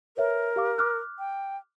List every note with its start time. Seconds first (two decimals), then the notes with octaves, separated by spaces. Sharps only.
0.17 A#4 B4 C#5 E5
0.56 G4 F5 D6
0.78 D6 F6 F#6
1.19 G5